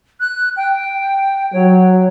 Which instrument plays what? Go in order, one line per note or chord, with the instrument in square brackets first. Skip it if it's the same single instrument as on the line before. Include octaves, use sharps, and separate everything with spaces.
[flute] F#6
G5
[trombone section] F#3 [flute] C#5